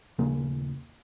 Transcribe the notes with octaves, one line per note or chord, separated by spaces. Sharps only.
D#1 D#2 C#3 A#3